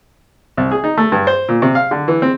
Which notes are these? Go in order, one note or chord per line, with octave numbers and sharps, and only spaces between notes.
C2
G#4
D#4
A3
G2
C5
A#2
C3
F5
D3
E3
C4